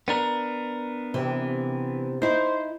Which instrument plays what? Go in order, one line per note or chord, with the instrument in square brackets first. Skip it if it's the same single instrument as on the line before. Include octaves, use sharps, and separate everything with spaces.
[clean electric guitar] B3 D4 A#4
[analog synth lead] C3 [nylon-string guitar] E3
[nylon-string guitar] D#4 E4 [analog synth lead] C5